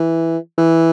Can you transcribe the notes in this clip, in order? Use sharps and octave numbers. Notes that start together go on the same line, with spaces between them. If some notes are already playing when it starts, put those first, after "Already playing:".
Already playing: E3
E3